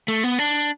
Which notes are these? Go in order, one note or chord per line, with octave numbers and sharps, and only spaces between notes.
A3
B3
D4